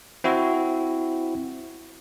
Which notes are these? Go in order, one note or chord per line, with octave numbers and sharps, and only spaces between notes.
C4 E4 F#4